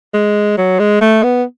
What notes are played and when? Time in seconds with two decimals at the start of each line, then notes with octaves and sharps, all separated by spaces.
0.14 G#3
0.57 F#3
0.79 G#3
1.01 A3
1.23 B3